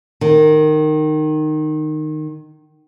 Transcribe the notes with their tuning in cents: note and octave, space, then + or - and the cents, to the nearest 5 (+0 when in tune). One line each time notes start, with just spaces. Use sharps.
D#3 -15